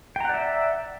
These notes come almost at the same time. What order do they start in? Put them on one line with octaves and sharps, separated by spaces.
G5 A#5 F#5 D5 E5